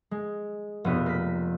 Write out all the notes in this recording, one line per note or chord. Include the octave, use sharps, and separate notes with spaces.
G#3
F1 B2 B3 D#7
A#3 B6